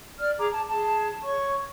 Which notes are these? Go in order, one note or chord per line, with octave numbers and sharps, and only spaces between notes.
D5 F6
G#4 A#5 D6
A5
G#4 A5
C#5 C#6